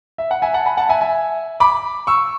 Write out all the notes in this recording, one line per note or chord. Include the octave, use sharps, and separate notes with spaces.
E5
F#5
E5 G#5
F#5 A5
G#5 B5
F#5 A5
E5 G#5
E5 G#5
B5 D6
C#6 E6